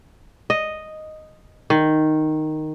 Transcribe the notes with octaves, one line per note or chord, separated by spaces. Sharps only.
D#5
D#3